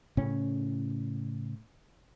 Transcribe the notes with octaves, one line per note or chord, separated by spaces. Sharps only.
A2 C#3 C#4